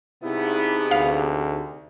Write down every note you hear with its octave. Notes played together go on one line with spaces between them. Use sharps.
G2 C3 B3 D#4 E4 G#4
D2 F5